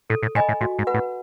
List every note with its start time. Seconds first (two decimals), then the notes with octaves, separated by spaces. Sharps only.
0.10 A2 A4
0.23 A2
0.35 A2 D#5 G#5 B5
0.49 A2
0.61 A2 F#4
0.79 G#2
0.87 B4 F#5 B5
0.94 A2